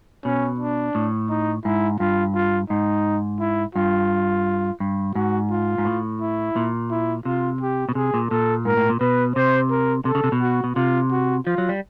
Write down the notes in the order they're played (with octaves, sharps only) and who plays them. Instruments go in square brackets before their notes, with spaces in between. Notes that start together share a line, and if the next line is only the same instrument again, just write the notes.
[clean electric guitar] B2 [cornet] C#4
[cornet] D4
[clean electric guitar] A2
[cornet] D#4
[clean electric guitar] G#2 [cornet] E4
[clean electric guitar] G2 [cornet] F4
[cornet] F4
[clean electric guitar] G#2 [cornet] D#4
[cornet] E4
[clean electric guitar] G2 [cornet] F4
[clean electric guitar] G2
[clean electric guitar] G#2 [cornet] F#4
[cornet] F4
[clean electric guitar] G#2
A2
[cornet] E4
[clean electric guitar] A#2
[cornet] E4
[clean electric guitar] C3 [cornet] F4
[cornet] G4
[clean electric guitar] B2
[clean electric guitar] C3 [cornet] G#4
[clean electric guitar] A#2
[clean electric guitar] A#2 [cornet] A4
[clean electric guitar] G#2 [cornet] A#4
[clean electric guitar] A2
A#2
[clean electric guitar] B2 [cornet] B4
[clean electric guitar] C3 [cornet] C5
[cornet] A#4
[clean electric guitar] C3 [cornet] A4
[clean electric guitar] C#3
C3
B2
[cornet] F#4
[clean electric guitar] B2
[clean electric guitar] C3 [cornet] F4
[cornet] F#4
[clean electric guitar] F3 [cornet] F4
[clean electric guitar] F#3
G3